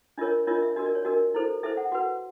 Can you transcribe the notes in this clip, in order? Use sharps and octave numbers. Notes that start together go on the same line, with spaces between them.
D4 F4 A#4 C#5 D#5
D4 F4 A#4 C#5 D#5
E5
D4 F#4 A#4 D#5
D5
C#5
D4 F#4 A#4 D#5
E4 A4 C5
E4 A4 C5 E5
F#5
F#4 B4 F#5